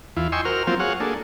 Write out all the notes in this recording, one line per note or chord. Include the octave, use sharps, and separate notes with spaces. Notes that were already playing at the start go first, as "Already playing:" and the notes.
E2 E4 F4
D#5 G5 G#5 C6 C#6 E6
F#4 A#4 C5 F6
F3 F#3 A#3 C4 F4 C5
F#4 G#4 C#5 F5 F#5
A#3 D4 G#4 A4